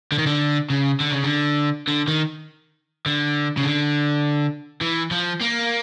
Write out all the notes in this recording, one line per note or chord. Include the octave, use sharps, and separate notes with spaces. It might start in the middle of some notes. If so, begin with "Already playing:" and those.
D3
D#3
D3
C#3
D3
C#3
D3
D3
D#3
D3
C#3
D3
E3
F3
A#3